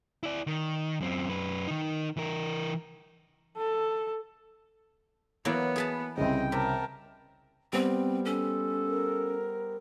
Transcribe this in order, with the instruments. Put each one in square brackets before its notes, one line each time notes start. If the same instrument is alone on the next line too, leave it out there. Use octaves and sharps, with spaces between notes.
[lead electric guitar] E4 D5
D#3
F#2 C4
F#2 B4
D#3 D#4
E3 A#4
[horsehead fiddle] A4
[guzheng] E3 F#3 A#3 [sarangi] B3
[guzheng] G#4 B4 A5
[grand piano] C2 C#3 [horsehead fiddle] C4 D#5 [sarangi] G5
[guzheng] C3 [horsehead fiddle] A#4 A5
[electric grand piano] G3 B3 C5 [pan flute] C4
[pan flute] C#4 [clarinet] A4
[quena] A#4